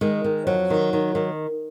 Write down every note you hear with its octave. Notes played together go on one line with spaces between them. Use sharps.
D#3 G#3
D#3
F2 F#3
D#3
D#3
D#3